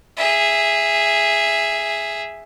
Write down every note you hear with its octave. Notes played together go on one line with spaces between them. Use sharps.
G#4 E5